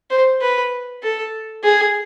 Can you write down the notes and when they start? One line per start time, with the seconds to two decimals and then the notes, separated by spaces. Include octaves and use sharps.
0.10 C5
0.41 B4
1.02 A4
1.64 G#4